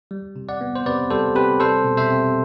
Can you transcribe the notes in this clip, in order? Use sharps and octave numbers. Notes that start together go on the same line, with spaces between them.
G3
C3
D5 F#5
B3
C5
C3 B4 D5
G3 A4 C5
C3 G4 B4
G3 A4 C5
B2
C5 E5
C4